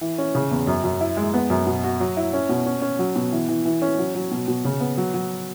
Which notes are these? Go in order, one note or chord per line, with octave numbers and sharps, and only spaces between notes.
E3
C#4
C#3
E2
F#2
F#2
E4
G#3
B3
F#2
B2
F#4
F#3
E4
C#4
B2
C#4
C#4
F#3
B2
E3
E3
E3
C#4
F#3
F#3
B2
B2
C#3
B3
F#3
F#3